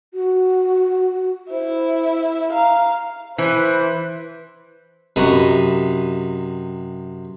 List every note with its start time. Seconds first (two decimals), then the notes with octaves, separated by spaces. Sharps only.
0.14 F#4
1.51 E4 C5
2.53 F5 A#5
3.38 E3 B4 C5
5.16 F#2 C3 B4 D#5